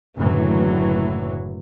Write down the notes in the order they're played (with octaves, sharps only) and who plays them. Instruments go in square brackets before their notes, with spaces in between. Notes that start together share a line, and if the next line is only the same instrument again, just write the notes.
[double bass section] F#1 A2 D3 E3 F#3